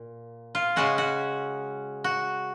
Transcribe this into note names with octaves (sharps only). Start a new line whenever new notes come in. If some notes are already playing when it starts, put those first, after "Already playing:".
Already playing: A#2
F4
C#3 G#3 C#4 F#4
F#4
F#4